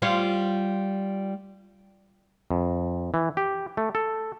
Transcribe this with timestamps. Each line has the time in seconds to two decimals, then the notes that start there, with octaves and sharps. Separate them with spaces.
0.02 G3 F4 C#5
2.51 F2
3.14 E3
3.37 G4
3.77 A3
3.95 A4